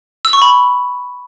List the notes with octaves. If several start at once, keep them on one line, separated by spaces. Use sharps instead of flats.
E6
C#6
B5